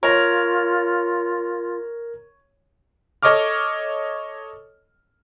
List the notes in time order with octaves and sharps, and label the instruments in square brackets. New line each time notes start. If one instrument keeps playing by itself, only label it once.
[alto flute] F4 [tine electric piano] A#4 A#5 [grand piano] C#5
[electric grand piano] A4 C#5 D#5 C#6 D6 F6